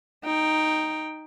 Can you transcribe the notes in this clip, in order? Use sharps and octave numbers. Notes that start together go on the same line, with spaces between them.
D#4 G5